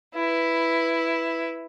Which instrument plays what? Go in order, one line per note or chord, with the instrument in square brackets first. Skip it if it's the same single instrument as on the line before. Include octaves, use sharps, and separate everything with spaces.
[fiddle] E4 B4